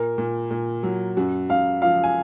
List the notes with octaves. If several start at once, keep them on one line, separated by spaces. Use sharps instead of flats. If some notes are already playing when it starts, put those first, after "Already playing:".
Already playing: A#2 A#4
A#2
A#2
F#3
F#2 F#4
F#2 F5
F3 F5
G#5